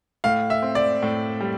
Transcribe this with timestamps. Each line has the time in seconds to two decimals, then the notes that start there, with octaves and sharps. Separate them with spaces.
0.24 A2 F5
0.50 E5
0.62 C4
0.75 D5
1.03 A2
1.41 G3